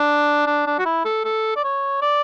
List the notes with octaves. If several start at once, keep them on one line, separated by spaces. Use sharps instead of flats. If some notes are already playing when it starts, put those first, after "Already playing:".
Already playing: D4
D4
D4
F#4
E4
A4
A4
D5
C#5
D5